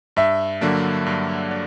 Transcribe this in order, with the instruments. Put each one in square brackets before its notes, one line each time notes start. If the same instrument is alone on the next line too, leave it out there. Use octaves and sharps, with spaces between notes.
[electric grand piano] G2 [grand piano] E5
[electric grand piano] D3 F#3 A#3 D4
G2
D4